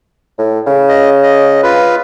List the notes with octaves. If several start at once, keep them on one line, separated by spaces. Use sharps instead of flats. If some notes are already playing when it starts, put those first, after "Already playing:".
A2
C#3
D#5
D#5
F4 B4